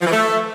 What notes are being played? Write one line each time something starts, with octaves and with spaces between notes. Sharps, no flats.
F3
E3
A3